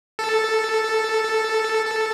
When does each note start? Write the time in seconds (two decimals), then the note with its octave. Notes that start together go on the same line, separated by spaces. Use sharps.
0.19 A4
1.86 A4